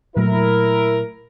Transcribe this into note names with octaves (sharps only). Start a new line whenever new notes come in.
A#2 F#3 A3 E4 A#4